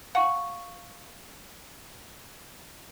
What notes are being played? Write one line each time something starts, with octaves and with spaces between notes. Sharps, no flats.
F5 F#5 G#5 C#6